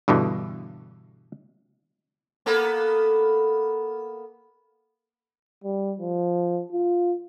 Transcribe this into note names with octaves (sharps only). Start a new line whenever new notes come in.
G2 B2 D3 E3
A#3 B3 A4
G3
F3
F4